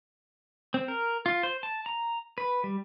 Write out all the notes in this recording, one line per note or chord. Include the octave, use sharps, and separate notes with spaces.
C4
A#4
F4
C5
A5
A#5
B4
G3